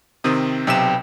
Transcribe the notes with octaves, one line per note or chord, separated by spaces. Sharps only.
C3 D#3 C4 D#6
B1 C3 B4 E5 G5 E7